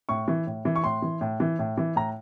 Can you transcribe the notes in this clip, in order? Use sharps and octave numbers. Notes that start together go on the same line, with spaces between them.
A2 C#6
E3
A2
E3
C#6
A2 C6
E3
A2
E3
A2
E3
A2 A#5